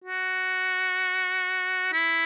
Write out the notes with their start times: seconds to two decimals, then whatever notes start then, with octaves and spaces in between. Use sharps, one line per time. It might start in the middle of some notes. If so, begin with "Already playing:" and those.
0.05 F#4
1.93 E4